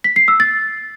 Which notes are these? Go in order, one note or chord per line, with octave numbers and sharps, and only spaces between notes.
B6
C7
E6
A6